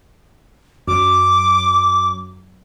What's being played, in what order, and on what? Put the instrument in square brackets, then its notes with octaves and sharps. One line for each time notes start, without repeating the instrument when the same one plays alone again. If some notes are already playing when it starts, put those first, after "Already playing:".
[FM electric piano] F#2 F#3 [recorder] D6